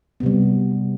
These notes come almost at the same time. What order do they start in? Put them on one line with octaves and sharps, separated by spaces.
B3 C3 G3